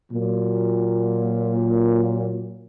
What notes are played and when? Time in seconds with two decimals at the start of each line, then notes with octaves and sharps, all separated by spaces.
0.12 A#2 F#3